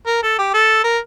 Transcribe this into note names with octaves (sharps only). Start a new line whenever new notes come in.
A#4
A4
G4
A4
A#4